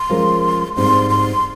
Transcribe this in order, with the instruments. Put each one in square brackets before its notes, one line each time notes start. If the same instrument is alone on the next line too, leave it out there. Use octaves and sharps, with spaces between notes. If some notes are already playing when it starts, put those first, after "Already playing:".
Already playing: [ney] C6
[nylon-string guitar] F3 G#3 C#4 F4 A#4
[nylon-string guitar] G#2 G3 C4 D#4 [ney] C6
[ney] C6